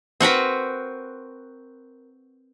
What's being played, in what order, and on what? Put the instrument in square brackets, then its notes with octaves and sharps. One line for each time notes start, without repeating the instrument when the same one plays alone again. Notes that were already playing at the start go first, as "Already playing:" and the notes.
[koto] C4 F#4 A#4 B4